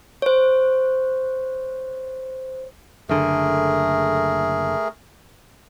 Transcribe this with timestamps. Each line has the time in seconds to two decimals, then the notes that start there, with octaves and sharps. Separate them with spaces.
0.22 C5 C#5
3.09 F#1 D3 A3 G#4 A#4